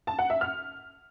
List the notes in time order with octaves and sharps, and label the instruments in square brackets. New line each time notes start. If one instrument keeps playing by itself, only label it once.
[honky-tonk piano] A5
F#5
E5
F6